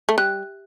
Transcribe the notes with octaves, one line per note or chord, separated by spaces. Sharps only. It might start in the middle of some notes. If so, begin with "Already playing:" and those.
A3
G3 F#6